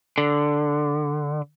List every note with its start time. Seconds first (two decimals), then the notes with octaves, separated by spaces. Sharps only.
0.18 D3